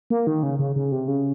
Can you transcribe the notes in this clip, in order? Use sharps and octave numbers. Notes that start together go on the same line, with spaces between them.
A#3
D#3
C#3
C#3
C#3
C3
C#3